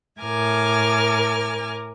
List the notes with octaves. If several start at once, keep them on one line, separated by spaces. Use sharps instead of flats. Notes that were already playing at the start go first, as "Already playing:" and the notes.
A2 A#4 G#5 D6 F6